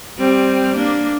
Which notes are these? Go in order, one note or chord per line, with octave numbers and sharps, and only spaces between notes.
G3 C4
A#3 D4